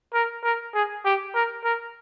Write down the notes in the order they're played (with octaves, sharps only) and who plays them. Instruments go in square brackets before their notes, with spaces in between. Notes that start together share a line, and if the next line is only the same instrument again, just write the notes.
[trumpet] A#4
A#4
G#4
G4
A#4
A#4